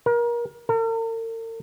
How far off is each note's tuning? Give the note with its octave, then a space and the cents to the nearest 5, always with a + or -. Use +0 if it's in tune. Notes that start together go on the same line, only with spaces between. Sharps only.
A#4 +30
A#4 -45